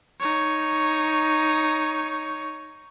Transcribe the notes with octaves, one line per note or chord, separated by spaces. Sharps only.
D#4 C#5